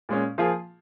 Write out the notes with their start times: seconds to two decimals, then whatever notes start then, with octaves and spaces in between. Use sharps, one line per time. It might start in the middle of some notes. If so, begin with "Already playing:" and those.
0.09 A#2 G#3 C#4
0.38 F3 A#3 F4 G#4